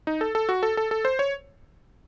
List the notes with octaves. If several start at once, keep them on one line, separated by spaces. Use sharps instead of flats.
D#4
A4
A4
F#4
A4
A4
A4
C5
C#5